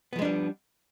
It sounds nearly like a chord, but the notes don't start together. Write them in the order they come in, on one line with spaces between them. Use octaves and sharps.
B3 F3 G#3 D4 G3